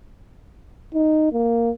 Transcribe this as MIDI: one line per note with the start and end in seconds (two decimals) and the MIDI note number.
0.94 1.30 63
1.33 1.71 58